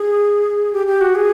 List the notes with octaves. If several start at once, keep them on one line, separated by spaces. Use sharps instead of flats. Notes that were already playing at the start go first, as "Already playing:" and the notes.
Already playing: G#4
G4
G4
F#4
G#4